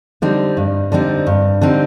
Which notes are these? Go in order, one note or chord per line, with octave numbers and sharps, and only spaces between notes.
D3 G3 C4 D#4
G2
D3 G3 C4 D#4
G2
D3 G3 C4 D#4